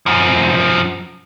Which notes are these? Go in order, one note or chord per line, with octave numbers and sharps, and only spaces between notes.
F#2 F3